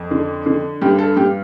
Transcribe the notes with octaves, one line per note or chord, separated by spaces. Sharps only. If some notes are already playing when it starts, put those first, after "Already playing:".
Already playing: F2
D3
D3
G2 G4
A4
G2 G4